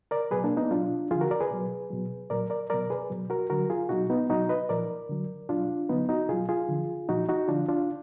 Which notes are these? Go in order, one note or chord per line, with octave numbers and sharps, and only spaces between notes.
A#4 D5
B2 F#3 G#4 B4
A#3 D4
B3 D#4
B2 F#3 D4 F4
D3 F3 F4 G#4
F#4 A#4
A#4 D5
G#4 B4
B2 F#3
B2 F#3
A#2 F#3 A#4 D5
A#4 D5
B2 F#3 A#4 D5
G#4 B4
B2 F#3
F#4 A#4
D3 F#3 F#4 A#4
F4 G#4
B2 F#3 D#4 F#4
B3 D#4
B2 F#3 D#4 F#4
B4 D#5
A#2 F3 A#4 D5
D3 F#3
B2 F#3 D4 F4
D3 F#3 B3 D#4
D#4 F#4
B2 F#3 F4 G#4
F4 G#4
D3 F3
A#2 F3 D#4 F#4
D#4 F#4
D3 F3 D4 F4
D4 F4